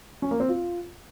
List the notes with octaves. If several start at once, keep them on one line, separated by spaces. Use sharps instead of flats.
C#4
A#3
C4
F4